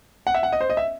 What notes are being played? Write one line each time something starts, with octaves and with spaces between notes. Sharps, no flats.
F#5
E5
F#5
D#5
C5
D#5
E5